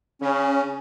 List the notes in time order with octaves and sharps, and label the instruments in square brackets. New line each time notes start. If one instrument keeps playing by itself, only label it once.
[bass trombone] C#3 [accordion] C#4